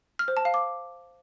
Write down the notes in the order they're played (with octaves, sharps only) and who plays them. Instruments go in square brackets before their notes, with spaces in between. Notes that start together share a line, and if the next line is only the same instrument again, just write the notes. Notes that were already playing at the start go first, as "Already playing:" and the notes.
[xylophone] F6
C5
A5
F5
D6